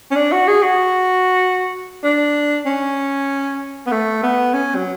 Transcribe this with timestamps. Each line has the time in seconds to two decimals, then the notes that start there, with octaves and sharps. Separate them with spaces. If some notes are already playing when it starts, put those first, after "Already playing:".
0.11 C#4
0.16 D4
0.32 F#4
0.48 G#4
0.63 F#4
2.04 D4
2.66 C#4
3.87 B3
3.92 A3
4.23 B3
4.54 C#4
4.76 F#3